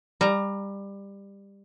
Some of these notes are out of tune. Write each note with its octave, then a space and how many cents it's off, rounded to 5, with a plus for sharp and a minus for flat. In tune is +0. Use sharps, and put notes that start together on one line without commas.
G3 +20 A#5 +0